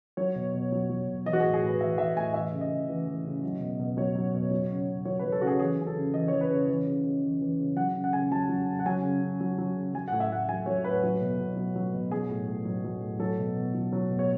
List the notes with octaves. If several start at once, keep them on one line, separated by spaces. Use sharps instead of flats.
F#3 C#5
B2
B2
F#3
F#3
B2
E3 D#5
F#4
A2 G#4
G#4
A2 B4
E3 E5
E3 E5
A2 G#5
E3 E5
C#3
D#5
C#3
E3
E3
C#3
F#3
B2
B2
F#3 C#5
F#3
B2
F#3
C#3
C#3
F#3 C#5
B4
F#3
A4
C#3 F#4
G#4
E3 G#4
C#3 G#4
A4
C#3
E3 D#5
E3 C#5
B4
C#3
E3
C#3
C#3
E3
E3
C#3
F#3 F#5
C#3
F#5
C#3 G#5
F#3 A5
F#3
C#3
F#5
F#3 G#5
C#3
C#3
F#3
F#3
C#3
F#3 G#5
A2 F#5
E5
A2 F#5
F#3 G#5
F#3 C#5
A2 B4
F#3
B2
B2
F#3
F#3
B2
F#3 G#4
A2
A2
F#3
F#3
A2
F#3 A4
B2
B2
F#3
F#3
B2
C#5